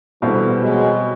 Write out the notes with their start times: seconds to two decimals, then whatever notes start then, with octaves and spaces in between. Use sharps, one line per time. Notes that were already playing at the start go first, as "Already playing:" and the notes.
0.22 B2 D3 E3 G3 C4 E4
0.62 F#3 G#3